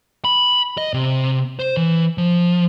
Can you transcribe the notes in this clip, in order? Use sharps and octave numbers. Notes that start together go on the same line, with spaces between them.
B5
D#5
C3
C5
E3
F3